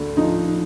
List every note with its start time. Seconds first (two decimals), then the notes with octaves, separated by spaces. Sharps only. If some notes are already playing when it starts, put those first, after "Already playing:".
Already playing: D2 D3
0.17 F3 D#4